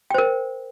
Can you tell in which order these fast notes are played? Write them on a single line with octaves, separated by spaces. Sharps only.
G5 C5 A#4